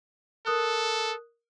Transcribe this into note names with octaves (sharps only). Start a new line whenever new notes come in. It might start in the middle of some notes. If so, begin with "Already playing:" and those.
A4 A#4 D#6 F#6